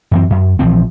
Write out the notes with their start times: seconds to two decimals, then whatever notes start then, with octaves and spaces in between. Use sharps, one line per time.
0.11 F#2 E3 C4
0.30 F#2
0.59 A#1 E3 F3 C4